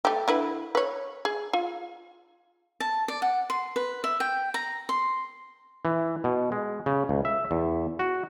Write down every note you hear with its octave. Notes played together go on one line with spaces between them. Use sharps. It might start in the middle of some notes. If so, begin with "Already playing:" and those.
A3 G4
D3 E4 B4
B4 C#5
G#4
F4
A5
D5
F#5
C6
B4
E5
G5
A#5
C6
E3
B2
G#3
C#3
C#2
E5
E2
F#4